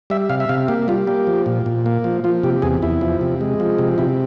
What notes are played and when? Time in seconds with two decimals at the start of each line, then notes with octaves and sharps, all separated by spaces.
0.10 G3 E5
0.29 C3 F5
0.40 E5
0.49 C3 F5
0.68 A#3 G4
0.88 G3 F4
1.07 A#3 G4
1.27 F3
1.46 A#2
1.66 A#2
1.86 A#3
2.04 F3
2.24 F3 F4
2.43 C3 G4
2.62 E2 G#4
2.82 E2 E4
3.01 F3
3.21 C3
3.41 G#3
3.60 F3
3.78 C3
3.98 C3 E4